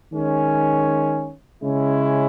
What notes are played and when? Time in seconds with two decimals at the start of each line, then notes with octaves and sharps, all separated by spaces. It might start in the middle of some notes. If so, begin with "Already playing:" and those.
0.13 D#3 G#3 C#4
1.61 C#3 G#3 C#4 E4